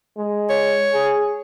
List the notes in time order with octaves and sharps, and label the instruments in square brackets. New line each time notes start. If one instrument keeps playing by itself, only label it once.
[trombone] G#3
[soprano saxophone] C#5
[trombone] G#4